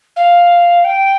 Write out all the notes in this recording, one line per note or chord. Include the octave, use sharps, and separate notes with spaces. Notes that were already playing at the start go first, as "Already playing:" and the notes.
F5
G5